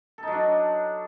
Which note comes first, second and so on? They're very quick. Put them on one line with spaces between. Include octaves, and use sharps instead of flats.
A4 D#4 F#3 D4